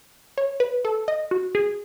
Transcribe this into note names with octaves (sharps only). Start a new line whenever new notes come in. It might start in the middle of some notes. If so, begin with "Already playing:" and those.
C#5
B4
A4
D#5
F#4
G#4